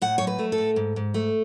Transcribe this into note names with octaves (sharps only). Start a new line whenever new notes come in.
A2 F#5
F#3 C#5
B4
A3
A4
A2
G#2
G#2
A3